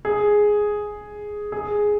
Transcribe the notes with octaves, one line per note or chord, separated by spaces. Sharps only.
G#4
G#4